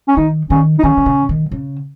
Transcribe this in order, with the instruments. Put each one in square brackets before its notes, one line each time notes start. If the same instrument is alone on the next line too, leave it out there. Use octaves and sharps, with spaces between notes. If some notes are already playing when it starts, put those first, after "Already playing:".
[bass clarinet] C#4
[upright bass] D#3 [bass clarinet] D#4
[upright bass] D#3 [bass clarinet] C#4
[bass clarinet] D#4
[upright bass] D#3 [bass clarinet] C#4
[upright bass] D#3
C#3
D#3
C#3